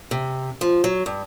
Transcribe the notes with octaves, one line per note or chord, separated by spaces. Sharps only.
C3
F3
F#3
G2